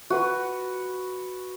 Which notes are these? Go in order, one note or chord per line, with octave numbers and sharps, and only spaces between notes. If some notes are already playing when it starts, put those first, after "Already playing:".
F#4 B4